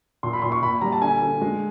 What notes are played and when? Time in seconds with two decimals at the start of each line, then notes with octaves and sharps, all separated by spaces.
0.23 A#2 C6
0.33 B5
0.42 A#2 C6
0.52 C#6
0.62 A#2 B5
0.81 G3 A#5
0.92 A5
1.01 D3 G#5
1.22 D3
1.42 G#3